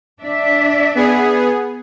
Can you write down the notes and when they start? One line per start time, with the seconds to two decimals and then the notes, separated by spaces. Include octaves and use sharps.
0.21 D4 D5 E5
0.95 B3 G#4